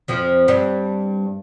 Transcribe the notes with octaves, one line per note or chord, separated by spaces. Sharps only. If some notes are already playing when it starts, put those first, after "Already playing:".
F2 F3
G2 G3